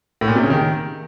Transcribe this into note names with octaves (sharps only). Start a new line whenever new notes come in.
A2
A#2
C3
C#3
D#3